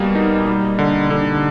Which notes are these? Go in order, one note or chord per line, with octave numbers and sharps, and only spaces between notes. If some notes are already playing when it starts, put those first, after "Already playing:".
Already playing: B2 G3 A#3
D#4
G3
D3
D3